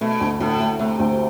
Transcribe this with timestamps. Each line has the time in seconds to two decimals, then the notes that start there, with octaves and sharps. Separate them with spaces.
0.01 B2 A3
0.21 D2
0.40 D2 A2
0.60 A3
0.79 C3 A3
1.00 D2